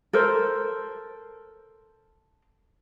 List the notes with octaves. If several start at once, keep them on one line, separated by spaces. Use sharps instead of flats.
A4 A#4 C5